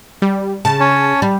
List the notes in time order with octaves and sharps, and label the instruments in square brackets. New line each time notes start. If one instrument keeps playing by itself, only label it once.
[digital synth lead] G3
[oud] C#3 [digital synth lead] A5
[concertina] C#4 C#5
[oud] G3